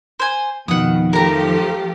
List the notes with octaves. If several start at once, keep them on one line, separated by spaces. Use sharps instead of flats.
C5 G#5
F2 B2 D#3 F#5 D#6
F3 A3 G4 A#4 A#5